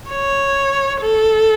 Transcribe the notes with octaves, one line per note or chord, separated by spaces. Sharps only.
C#5
A4